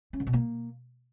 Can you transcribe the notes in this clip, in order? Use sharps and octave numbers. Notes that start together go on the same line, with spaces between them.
C#4
D3
B2
A#3